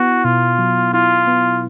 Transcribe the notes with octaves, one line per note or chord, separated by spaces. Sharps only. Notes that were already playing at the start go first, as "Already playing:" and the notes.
Already playing: B3 E4 F#4
B2 F4
F#3
E4 F4
B3